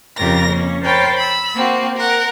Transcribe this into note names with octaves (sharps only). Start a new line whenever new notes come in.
F2 C#3 F4 G4 A#4 A#6
A#3 C#4
A#4 C5 C#5 G5 A5 B5
B5 E6
A#3 C4 F#4
A#4 F#5